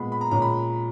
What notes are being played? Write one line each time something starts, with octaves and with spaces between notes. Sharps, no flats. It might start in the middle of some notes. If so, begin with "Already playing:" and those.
Already playing: A#2 G#3 B3 B5
B5
A#5
A#2 G#3 C#4 A#5
B5